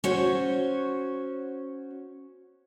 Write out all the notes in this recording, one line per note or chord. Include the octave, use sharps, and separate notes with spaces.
C#4 F#4 C5 C#5